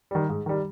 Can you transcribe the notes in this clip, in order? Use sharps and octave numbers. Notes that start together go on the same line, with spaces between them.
D#3 G3
G#2
D#3 G3